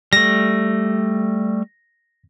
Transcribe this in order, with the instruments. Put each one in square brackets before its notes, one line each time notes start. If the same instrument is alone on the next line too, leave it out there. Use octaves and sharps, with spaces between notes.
[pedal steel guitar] G3 A3 [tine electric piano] A#6